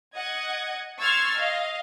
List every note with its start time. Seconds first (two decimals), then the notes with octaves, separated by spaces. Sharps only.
0.13 D#5 F#5 G#6
1.01 C6 C#6 E6 F6 G#6 A6
1.36 D#5 F5